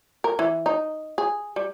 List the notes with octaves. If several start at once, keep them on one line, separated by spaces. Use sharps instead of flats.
A#4
E3
D#4
G#4
G3